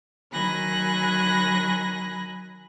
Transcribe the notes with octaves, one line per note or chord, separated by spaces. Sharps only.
D#3 F#3 G#5 B5 F#6 A#6